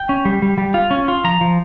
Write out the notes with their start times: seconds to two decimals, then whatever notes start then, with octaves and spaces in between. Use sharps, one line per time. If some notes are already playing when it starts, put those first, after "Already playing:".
Already playing: G5
0.09 C#4
0.25 G3
0.42 G3
0.58 G3
0.74 F4
0.91 C#4
1.08 F4
1.24 F3 A#5
1.41 F3